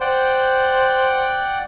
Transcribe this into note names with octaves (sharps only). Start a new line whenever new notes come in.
C5 D5 F#5 G5